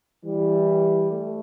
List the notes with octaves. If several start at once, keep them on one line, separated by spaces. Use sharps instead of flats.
E3 G3
A3